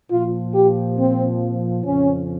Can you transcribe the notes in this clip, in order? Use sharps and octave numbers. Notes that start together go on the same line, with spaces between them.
A#2 F3 F4
G4
C4
F2 C#3 F3 C#4